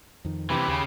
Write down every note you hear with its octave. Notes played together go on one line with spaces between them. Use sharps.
F2 D#3
C3 E3 G4 B5
D#2 C#3